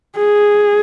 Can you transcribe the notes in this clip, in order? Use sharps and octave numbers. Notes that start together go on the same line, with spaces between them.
G#4